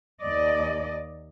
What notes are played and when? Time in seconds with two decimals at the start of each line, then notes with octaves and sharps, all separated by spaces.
0.21 D#2 D5 D#5